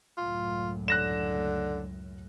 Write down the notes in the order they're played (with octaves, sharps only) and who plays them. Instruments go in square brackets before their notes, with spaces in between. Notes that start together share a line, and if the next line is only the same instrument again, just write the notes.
[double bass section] C#2 F#2 A2 [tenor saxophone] F4
[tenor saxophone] D3 [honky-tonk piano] F#6 A#6 E7